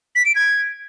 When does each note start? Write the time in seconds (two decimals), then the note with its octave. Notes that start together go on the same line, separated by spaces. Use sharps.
0.16 B6
0.26 D7
0.36 G#6